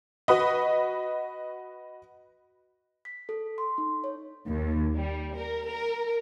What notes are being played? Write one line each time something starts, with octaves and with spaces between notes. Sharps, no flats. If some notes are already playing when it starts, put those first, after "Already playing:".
F#4 B4 D#5
B6
A4
C6
D#4
C#5
D#2
G3
A#4
A#4